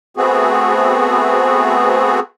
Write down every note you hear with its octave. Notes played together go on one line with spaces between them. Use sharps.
A3 B3 C4 F#4 G#4